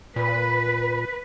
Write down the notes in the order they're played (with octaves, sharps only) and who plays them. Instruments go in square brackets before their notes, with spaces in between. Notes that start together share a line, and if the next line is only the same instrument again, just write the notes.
[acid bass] A#2 [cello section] B4